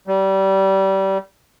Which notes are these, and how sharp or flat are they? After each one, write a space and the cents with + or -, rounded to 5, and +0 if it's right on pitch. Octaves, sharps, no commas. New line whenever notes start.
G3 -25